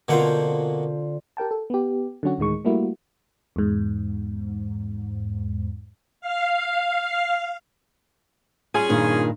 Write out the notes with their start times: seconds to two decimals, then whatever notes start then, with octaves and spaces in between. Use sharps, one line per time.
0.08 B2 D3 A#3 C4 F4 F#5
1.37 G4 A#4 G5 A5
1.51 A4
1.70 B3 G4
2.23 D3 F#3 C#4 F#4
2.38 D2 A2 D#3 G#3 C#6
2.65 G3 A3 A#3 E4 F#4
3.56 E2 G#2
6.21 F5
8.74 G3 C#4 F4 G#4 G#5
8.89 G2 A#2 D#3